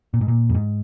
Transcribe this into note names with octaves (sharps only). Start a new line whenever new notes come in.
A#2
G#2
A#2
F2
G#2